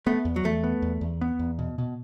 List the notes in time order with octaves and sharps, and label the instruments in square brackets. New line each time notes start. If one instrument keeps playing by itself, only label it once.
[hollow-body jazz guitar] A3 [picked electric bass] B3
[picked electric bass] E2
[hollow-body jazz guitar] F#3
[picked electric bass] E2 [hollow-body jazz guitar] A3
[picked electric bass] B3
E2
E2
B3
E2
B2
B2